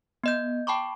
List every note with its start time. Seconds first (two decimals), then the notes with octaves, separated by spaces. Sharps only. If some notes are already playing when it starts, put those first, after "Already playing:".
0.24 B3 D#5 G6
0.67 G5 A5 B5 C#6 D6